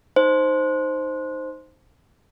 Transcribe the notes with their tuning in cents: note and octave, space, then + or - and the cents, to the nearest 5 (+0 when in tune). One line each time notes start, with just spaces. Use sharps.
D#4 +0 C5 +0